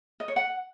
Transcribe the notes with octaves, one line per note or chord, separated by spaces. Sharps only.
D#5
C#5
F#5